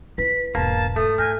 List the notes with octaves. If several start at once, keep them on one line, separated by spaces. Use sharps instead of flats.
E4 B4 B6
E1 G#2 A#3 A5
A3 A4 D#6
D#4 G#5 F6 G6 A#6